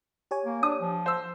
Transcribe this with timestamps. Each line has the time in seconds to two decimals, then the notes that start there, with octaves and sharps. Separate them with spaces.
0.31 G4 C#5 G#5
0.45 A#3
0.63 D4 D#6
0.81 F3
1.06 C5 E6